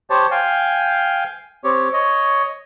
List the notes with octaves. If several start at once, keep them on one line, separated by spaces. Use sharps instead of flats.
G4 C5 C#5 A5
F5 G5 G#5
C4 G4 C#5
C#5 D#5